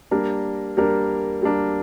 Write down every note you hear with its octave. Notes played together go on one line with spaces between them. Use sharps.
G3 A#3 D4 A#4
G3 A#3 D4 A#4
G3 A#3 D4 A#4